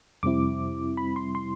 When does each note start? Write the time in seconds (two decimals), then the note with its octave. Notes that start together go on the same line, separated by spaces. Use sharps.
0.23 F2 C3 G3 C4 E4 D6
0.97 B5
1.16 C6
1.35 C6